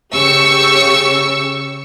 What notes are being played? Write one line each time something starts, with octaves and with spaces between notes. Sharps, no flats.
C#3 G4 C#6 E6 C#7